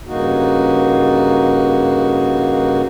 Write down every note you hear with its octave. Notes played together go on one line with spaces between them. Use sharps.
G2 C#3 A#3 D#4 F#4